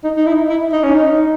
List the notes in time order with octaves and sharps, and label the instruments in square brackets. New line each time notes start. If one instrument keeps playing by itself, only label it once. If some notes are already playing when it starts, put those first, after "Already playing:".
[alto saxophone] D#4
D#4
E4
E4
D#4
C#4
D#4